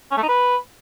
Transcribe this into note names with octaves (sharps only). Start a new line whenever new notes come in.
C#4
A3
D#4
B4